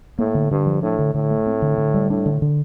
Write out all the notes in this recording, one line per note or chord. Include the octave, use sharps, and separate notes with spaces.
A2 A#3
D3
G2 D3
F3
A2 D4
D3
A2 D3
A3
C4
D3
D3
G3
A2 D4
D3
D3